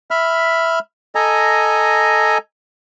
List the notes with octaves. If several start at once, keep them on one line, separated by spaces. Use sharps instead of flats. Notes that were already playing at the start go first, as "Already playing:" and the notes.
E5 B5 F6
A4 D#5 G#5 A#5